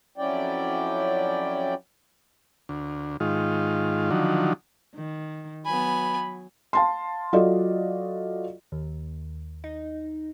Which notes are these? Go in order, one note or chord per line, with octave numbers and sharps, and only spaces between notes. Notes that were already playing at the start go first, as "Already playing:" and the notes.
F2 F#3 C#4 E4 D5 G5
D2
G#2 D#3 F4
D3 D#3 F3 F#3
D#3
F#3 B3 G#5 B5
F5 A5 C6
F#3 F4 F#4 A4 D5 D#5
D#2
D#4